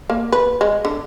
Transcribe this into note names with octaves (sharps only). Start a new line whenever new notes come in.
A#3
B4
G#3
D3